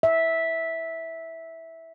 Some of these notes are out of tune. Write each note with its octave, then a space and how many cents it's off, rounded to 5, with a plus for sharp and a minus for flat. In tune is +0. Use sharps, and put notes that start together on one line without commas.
E5 -10